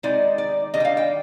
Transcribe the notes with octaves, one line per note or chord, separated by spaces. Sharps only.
D#3 G#3 C4 D#4 D5
D5
D#3 G3 D4 D#5
G5
F5
G5